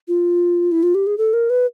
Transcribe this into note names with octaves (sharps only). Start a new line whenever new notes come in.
F4
E4
F4
G4
G#4
A4
A#4
B4